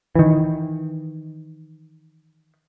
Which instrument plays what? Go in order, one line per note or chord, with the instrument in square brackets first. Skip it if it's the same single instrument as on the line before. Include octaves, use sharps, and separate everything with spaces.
[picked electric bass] D#3 E3